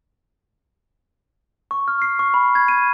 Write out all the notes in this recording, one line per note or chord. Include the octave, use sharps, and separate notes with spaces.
C#6
F6
C7
C#6
B5
G#6
D#7